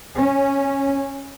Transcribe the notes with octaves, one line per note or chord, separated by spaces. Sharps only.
C#4